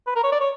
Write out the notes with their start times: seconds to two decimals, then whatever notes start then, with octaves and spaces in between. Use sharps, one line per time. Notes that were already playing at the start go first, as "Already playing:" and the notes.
0.07 B4
0.15 A#4
0.24 C#5
0.32 D5
0.40 C#5